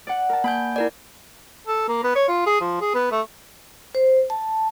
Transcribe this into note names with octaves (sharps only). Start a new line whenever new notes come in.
D5 F#5
A#4 A5
A#3 G#5 B5 G6
E4 A#4 D5
A4
A#3
B3
C#5
F4
G#4
F3
G#4
B3
A3
C5
A5